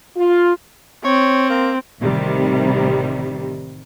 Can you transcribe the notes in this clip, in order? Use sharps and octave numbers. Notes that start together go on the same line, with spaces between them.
F4
C4 C#5
A#3
A1 C3 D#3 G3